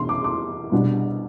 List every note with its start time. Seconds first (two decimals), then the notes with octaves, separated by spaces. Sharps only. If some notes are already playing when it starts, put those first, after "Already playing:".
Already playing: E2 B2 B3 D4 C6
0.09 D6
0.24 D6
0.72 C2 B2 G3 B3 D4